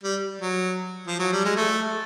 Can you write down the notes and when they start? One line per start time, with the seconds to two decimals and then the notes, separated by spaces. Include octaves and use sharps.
0.03 G3
0.41 F#3
1.07 F3
1.19 F#3
1.32 G3
1.45 G#3
1.56 A3